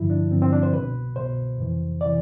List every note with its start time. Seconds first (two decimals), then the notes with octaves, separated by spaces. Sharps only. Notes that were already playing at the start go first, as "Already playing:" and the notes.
Already playing: G2 D3 F3 E4
0.10 D4
0.31 G2 D3 F3 C4
0.42 C4
0.52 D4
0.63 C5
0.73 C2 B2 B4
1.16 C2 B2 C5
1.58 F2 C3 E3
2.01 C3 E3 D5